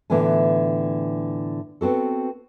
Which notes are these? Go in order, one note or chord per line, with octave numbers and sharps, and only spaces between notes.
A2 D3 E3 B3 F4 G#5
B3 C4 F#4 A4